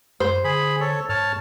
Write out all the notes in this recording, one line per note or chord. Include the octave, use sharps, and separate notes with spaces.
F#2 C5
D3 G#4 B5
A4 C#5
G#2 C#5 A5 F6